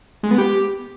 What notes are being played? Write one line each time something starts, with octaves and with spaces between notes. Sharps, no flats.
G#3
B3
G4